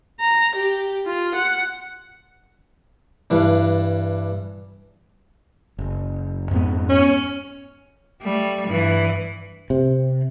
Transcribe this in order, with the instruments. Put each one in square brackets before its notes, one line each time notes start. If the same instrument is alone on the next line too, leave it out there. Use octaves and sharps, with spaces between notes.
[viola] A#5
G4
F4
F#5
[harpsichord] G2 E3 D4
[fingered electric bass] F#1
F2 G#2 B3
[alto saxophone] C#4
[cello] G3 A3
G2 E3
[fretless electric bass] C3